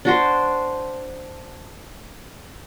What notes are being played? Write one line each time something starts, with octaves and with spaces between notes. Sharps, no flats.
D4 F#4 C5